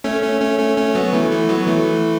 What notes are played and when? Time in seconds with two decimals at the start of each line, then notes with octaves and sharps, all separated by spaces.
0.04 A3 C#4
0.23 A3 C#4
0.41 A3 C#4
0.59 A3 C#4
0.77 A3 C#4
0.95 F#3 B3
1.13 E3 A3
1.31 E3 A3
1.49 F#3 B3
1.67 E3 A3